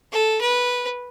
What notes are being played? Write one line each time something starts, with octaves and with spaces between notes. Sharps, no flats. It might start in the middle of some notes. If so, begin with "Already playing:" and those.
A4
B4